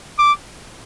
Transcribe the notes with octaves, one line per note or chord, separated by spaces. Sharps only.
D6